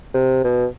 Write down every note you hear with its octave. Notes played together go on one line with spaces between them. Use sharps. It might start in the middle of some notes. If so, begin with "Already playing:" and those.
C3
B2